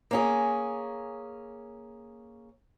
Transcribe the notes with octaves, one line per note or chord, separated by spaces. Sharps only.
A#3 C#4 G#4